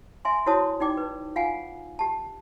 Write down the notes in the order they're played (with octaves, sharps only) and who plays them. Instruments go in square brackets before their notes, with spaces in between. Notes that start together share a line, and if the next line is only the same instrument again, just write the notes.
[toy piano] E5 G#5 C6
E4 F#4 C5 C#5 A5 D#6
D#4 D5 G5 D6
B4
F4 F5 F#5 G#5
G4 A5